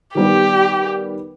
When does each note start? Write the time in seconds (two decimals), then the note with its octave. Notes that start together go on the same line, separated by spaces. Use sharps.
0.15 D#3 G3 B3 G4